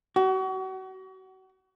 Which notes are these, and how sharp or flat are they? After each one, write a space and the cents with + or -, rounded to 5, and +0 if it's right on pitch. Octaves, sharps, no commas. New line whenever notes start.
F#4 +35